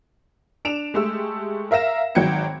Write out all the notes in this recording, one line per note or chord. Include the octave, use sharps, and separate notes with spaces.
D4 D7 E7 F7
G#3 A3 G4 E6
A#4 E5 F5 A#6 E7
G#1 D#3 F#3 G5 G#6 C#7